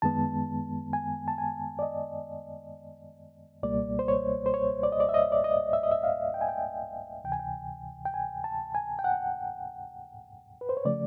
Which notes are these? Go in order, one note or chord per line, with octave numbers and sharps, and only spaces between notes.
F#2 D#3 G#3 B3 A5
G#5
A5
G#5
D5
D#5
C#2 B2 G3 A#3 D5
C5
C#5
C5
C#5
D5
D#5
D5
E5
D#5
D5
D#5
E5
D#5
E5
F5
G5
G#5
G5
D2 C3 E3 G5
G#5
G5
G5
G#5
A5
G#5
G5
F#5
B4
C5
C#5
C#3 F3 A3 D5